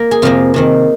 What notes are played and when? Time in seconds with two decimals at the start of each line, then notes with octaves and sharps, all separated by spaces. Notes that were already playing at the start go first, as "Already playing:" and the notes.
Already playing: A#3
0.11 G#4
0.22 F2 C3 F3 A#3 F4
0.54 C3 D#3 C4